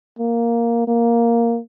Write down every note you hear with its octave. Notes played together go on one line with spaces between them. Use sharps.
A#3
A#3